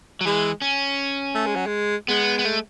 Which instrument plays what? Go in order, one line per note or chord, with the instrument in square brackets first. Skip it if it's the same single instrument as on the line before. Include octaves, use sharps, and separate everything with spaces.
[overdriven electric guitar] F#3
[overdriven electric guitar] E3 [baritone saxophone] G#3
[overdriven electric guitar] C#4
[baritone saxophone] A3
G#3
F#3
G#3
[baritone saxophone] G#3 [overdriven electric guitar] B3
[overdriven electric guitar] B3
A3